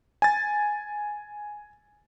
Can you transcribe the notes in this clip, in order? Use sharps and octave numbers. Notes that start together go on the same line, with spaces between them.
G#5 A6